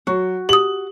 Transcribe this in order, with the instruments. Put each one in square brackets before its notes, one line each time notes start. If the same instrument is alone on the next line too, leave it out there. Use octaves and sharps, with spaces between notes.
[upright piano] F#3 [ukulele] F#4
[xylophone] G4 D#6 [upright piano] F#7